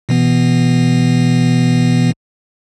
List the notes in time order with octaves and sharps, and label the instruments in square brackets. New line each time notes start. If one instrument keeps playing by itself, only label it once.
[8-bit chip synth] B2 E3 B3